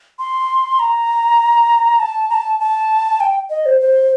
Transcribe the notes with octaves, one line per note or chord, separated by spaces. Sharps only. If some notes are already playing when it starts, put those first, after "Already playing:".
C6
A#5
A5
A#5
A5
A5
G5
D#5
C5
C5